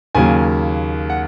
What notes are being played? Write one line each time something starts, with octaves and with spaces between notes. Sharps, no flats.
D#2 C#3 F#3 A#3 G#5
F#5